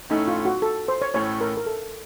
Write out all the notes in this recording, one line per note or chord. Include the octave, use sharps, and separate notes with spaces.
A2 A3 C#4 D#4 A4
F4
F#4
A4
C5
C#5
A1 A2 A3 C#4 C#5
A#4
A#4
A4